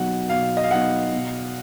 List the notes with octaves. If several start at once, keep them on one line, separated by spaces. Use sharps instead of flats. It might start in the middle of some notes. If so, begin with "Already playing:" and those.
Already playing: B2 F#3 B3 D#4 F#5
B2 F5
D#5
F5
F#3 B3 D#4 F#5
B2